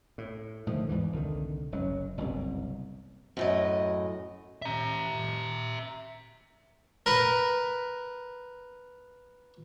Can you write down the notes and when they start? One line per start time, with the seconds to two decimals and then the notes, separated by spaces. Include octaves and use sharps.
0.18 A2
0.67 A2 D3 D#3 F3
0.89 E2 G#2 E3
1.12 C2 D3 D#3
1.72 F#1 F#3 C4 C#4
2.17 F#1 C2 G2 B2
3.37 F#2 A2 D#5
4.62 E5 A#5
7.06 A#4 B4